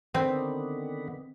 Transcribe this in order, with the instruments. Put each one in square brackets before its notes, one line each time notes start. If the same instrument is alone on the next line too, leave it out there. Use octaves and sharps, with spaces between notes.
[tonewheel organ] D3 D#3 B3 [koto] C4